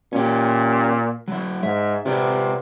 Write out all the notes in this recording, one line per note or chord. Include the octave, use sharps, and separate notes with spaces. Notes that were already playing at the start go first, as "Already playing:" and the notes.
A#2 C#4 G4
F#3 E4
G#2 E5
C3 F4 B4 D5